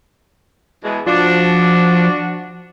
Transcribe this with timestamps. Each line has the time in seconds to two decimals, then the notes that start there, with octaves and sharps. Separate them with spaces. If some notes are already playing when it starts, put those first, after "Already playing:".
0.84 B2 E3 G#3
1.06 F3 D4 F#4